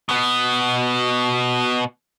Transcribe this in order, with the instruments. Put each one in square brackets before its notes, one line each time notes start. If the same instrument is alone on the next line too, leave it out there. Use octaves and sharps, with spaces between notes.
[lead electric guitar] B2 B3